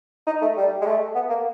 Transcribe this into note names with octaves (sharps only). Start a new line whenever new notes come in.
D#4
A3
G3
G#3
A3
B3
A#3